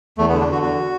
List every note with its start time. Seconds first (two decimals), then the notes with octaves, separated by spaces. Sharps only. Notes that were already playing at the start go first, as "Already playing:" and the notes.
0.18 E2 A3
0.29 B3
0.33 D3
0.41 D4
0.47 D3 F#4
0.62 E2 F#4